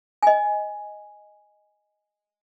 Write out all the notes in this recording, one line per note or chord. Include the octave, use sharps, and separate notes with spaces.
D#5 G#5